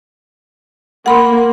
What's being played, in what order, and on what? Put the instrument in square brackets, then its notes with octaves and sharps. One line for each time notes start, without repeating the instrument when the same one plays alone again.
[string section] A#3 [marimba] F#5 B5 C6